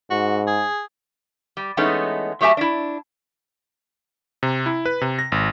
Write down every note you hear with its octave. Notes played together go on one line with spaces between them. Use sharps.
G#2 F#4
G#4
G3
E3 G#3 A3 B3 C#4 D#4
F#3 A3 G4 E5 G#5 A5
D4 E4
C3
E4
B4
C3
A#6
G#1